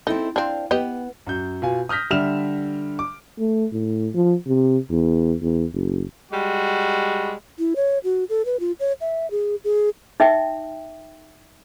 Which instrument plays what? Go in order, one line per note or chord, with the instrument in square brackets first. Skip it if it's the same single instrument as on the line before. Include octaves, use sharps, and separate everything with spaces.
[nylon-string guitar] C4 E4 A4 [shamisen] D#4
[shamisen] C4 D4 [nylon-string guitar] F5
[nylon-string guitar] B3 [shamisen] G4 D#5
[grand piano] F#2 G6
B2 F4 G#5
D#6 F6 G6 A#6 B6
D3 G3 E5 F6 E7 F7
D6
[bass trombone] A3
A2
F3
C3
E2
E2
F#1
[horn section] G3 G#3 F#4
[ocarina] E4
C#5
F#4
A4
B4
F4
C#5
E5
G#4
G#4
[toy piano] D#4 E5 G5